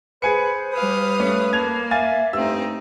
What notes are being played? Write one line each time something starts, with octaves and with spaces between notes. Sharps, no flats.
G#4 B4 C5 G#5 C#7
G3 B4 F5 D#6
A3 C#4
A#3 A5 G#6 F7
E5 F5 G#5 A6
G2 A3 C4 D#4 E6